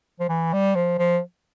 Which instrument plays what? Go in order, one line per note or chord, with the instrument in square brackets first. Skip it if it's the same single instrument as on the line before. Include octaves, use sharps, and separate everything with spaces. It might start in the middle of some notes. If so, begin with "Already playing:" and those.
[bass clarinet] F3
E3
G3
F3
F3